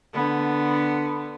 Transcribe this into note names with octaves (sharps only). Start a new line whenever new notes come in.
D3 B3